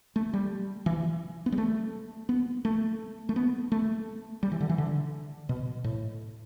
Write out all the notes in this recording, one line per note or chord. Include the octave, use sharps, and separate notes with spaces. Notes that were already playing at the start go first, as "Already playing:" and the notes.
A3
G3
E3
B3
G3
A3
B3
A3
A3
B3
A3
G3
E3
D3
E3
D3
B2
A2